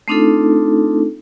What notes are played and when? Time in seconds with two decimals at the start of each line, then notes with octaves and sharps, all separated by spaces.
0.08 A3 C4 D4 D#4 F4 A4